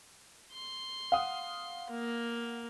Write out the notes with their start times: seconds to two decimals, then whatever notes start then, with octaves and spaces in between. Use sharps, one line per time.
0.53 C6
1.12 F5 F#5 D#6
1.90 A#3